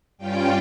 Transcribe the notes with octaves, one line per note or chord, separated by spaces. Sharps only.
G2 G3 C#4 F4 G5